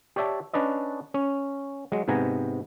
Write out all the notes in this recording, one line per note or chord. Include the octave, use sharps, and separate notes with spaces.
G4 C#5 D5 E5 A5
C#4 D4 B4 D5 D#5
C#4
F#3 G#3
G#2 C3 B3 G#5 A#5